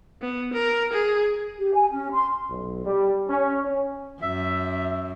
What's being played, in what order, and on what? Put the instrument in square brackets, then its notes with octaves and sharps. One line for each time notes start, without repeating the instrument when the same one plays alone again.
[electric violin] B3
A#4
G#4
[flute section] G4
G#5
C#4
C6
[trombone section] B1
G3
C#4
C#4
[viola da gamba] F#2 [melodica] E5